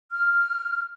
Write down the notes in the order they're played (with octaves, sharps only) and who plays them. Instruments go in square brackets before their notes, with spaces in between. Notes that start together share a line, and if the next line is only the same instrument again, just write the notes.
[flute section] F6